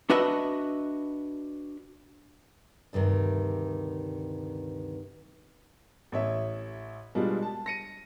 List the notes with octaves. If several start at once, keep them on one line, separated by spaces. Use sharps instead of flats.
D4 F#4 B4 D#5 E5
D2 G2 C3 D#3
A1 C#5 E5
B2 G3 G#3 D4 F4
A5
A#6 C#7 D#7